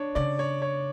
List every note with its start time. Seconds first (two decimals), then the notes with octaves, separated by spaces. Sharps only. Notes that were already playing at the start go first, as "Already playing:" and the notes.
Already playing: D4 C#5
0.15 C#3 D5
0.39 C#5
0.62 C#5